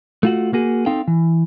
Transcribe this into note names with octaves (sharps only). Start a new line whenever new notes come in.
A3 F4 F#4
A#3 F#4 G#4
C4 D#4 A4 F5 G5
E3